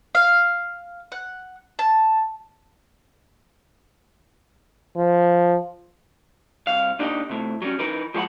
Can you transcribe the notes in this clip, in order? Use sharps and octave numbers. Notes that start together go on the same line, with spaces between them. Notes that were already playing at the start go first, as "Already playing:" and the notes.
F5
F#5
A5
F3
C2 F5
A#2 D4 D#4 G4 D5 D#5
A2 C3
F#3 G3 A3 C#4
E3 D#4 A#4 B4
F3 G#3 G4 C#5 F#5 B5